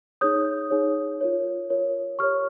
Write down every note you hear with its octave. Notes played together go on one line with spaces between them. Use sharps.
D#4 G#4 C#5 D#6 G6
D#4 G#4 C#5
F4 A#4 C#5
F4 A#4 C#5
G4 A#4 C#5 C#6 F6